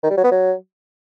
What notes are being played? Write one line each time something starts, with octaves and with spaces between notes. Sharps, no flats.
D#3
G3
F#3
B3
F#3